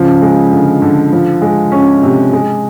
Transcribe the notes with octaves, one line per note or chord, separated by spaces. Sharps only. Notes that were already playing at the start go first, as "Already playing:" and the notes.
Already playing: C#3 F3
G#3
D3
D3
F3
G#3
C#4
C3
G#3